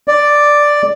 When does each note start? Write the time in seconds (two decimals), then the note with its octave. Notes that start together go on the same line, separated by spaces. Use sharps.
0.08 D5